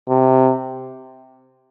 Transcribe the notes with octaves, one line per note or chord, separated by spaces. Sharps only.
C3